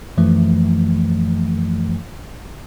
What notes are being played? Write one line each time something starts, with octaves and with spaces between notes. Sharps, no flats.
F#2 E3 F3 A3